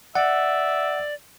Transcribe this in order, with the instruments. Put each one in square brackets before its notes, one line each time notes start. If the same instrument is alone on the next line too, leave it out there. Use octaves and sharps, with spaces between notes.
[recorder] D5 [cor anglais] E5 [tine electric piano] F#5